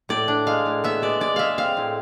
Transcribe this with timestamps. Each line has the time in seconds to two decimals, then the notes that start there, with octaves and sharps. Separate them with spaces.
0.09 A2 D5
0.28 D4
0.47 G#3 F5
0.66 A2
0.84 B3 E5
1.02 G#3 D5
1.20 G#3 D5
1.36 G#3 E5 F5
1.58 C4 F5
1.77 A2